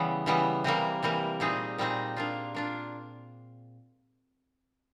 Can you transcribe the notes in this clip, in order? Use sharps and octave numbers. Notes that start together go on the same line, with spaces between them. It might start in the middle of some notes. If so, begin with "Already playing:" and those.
Already playing: C#3 E3 G3 B3
C#3 E3 G3 B3
C3 E3 G3 A#3
C3 E3 G3 A#3
A#2 G3 C4 D#4 G#4
A#2 G3 C4 D#4 G#4
A#3 D4 F4
A#3 D4 F4